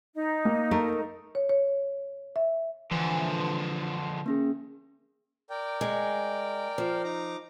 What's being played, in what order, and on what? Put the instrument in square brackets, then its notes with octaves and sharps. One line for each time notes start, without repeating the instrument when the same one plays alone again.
[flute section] D#4
[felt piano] A#3
[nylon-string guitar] A3 A#4
[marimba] C#5
C#5
E5
[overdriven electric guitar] D3 F3 [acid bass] E3
[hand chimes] A#3 C#4 G#4
[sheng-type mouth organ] A#4 D5 G5
[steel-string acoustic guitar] G#3
F3
[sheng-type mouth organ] D#4 A#5 D6